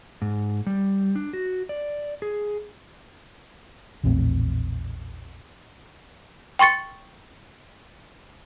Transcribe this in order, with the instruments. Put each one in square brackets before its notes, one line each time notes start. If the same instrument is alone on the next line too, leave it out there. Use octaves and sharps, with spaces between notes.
[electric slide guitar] G#2
G3
D4
F#4
D5
G#4
[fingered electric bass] A#1 E2 A2 C4
[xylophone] G5 C6 C#6 A6 C#7